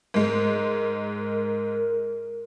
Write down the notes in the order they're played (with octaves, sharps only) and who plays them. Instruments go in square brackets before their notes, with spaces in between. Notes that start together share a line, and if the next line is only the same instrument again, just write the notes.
[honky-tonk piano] G#2 G#3 [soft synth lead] A#4